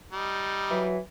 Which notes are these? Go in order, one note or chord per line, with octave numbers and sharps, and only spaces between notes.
G3 D#4
E3 F#3